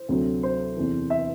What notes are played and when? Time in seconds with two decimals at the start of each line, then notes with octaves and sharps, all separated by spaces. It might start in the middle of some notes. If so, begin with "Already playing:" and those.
Already playing: C5
0.09 D2 C3 F#3 A3 C4
0.43 C5
0.77 E2 C3 E3
1.10 E5